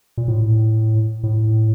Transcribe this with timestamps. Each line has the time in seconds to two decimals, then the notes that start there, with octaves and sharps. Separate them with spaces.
0.17 A#2
0.28 A2
1.23 A2